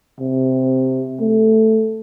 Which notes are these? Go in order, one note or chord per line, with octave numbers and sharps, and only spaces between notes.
C3
A3